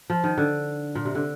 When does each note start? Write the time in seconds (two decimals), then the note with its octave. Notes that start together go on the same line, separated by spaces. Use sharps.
0.10 F3
0.24 D#3
0.38 D3
0.95 A#2
1.05 C3
1.15 D3